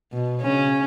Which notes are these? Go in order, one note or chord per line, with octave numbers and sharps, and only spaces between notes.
B2
C#3 C#4